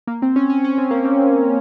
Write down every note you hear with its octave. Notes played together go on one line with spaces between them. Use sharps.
A#3
C4
C#4
C#4
C#4
C4
A#3
C4